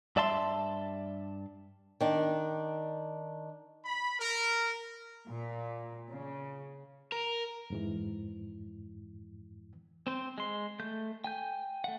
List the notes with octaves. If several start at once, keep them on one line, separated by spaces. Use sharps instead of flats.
G2 D5 E5 A5 C6
D#3 D4
B5
A#4
A#2
C#3
A#4
F2 G#2 E3
C4 C5
G#3 C6
A3 G6
G5 G#5 G6
A3 F#5